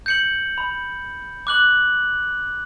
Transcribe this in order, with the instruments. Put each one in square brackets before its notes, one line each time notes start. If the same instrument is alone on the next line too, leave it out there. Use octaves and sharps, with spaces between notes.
[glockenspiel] G6 C#7 F#7
B5
D6 F#6 F#7